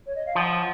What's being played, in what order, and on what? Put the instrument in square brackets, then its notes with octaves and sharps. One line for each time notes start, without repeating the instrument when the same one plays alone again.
[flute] C#5
D#5
F5
[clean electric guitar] F3 [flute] G#5
[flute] F#5